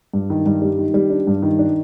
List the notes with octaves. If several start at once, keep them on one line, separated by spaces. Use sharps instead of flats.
G2
D#3
G2
G3
D#3
G3
D4
G2
D#3
D4